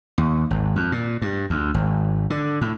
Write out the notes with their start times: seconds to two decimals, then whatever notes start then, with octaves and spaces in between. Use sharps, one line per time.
0.18 D#2
0.51 G#1
0.76 F2
0.92 A#2
1.22 G2
1.50 D2
1.74 G#1
2.30 D3
2.61 A2